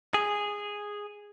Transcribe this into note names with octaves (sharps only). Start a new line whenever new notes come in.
G#4